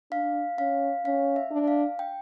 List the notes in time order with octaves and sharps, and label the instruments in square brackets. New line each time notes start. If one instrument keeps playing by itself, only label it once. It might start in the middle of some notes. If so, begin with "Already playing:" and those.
[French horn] D4 [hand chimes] F5
[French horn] C#4 [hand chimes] F5
[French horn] C#4 [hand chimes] F5
[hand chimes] E5
[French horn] D4
[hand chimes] F5
G5